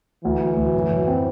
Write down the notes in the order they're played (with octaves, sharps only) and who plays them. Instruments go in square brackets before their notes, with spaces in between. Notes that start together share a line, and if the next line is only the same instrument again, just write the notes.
[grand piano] D2 [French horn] E3
[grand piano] F#3
D2
F#2
F#2
C4